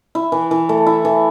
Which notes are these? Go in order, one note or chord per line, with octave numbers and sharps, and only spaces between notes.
E4
E3
E3
A3
E4
E3